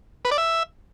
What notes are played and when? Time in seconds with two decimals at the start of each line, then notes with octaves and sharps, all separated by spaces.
0.25 B4
0.31 D5
0.38 E5